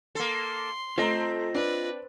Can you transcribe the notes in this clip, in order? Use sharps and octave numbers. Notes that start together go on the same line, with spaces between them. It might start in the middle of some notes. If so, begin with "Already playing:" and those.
A#3 A4 C6
A3 C4 F4 D#5 A#5
D4 B4 D5